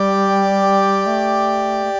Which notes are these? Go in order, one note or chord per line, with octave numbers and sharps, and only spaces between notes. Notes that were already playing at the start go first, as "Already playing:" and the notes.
Already playing: G3 G4 D5 G5
A3
A3